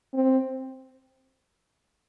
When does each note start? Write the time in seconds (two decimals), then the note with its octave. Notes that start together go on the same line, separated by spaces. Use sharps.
0.14 C4